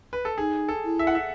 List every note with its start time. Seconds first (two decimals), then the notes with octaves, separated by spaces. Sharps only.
0.13 B4
0.25 A4
0.38 D#4 G#4
0.68 A4
0.84 E4
0.99 E5
1.07 F#5
1.15 E5